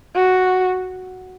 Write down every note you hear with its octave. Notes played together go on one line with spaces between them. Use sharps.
F#4